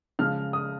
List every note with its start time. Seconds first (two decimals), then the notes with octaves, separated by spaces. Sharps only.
0.19 C#3 F3 G#3 F6
0.53 D#6